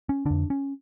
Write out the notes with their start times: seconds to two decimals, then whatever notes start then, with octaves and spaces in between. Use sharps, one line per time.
0.09 C#4
0.25 F2 D3 D4
0.50 C#4